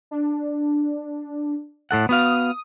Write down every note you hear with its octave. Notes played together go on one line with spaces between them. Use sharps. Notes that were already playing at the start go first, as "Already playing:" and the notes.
D4
A2 A4 F#5
B3 F#4 F5 D#6